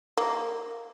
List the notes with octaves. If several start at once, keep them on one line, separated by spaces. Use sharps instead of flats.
A#3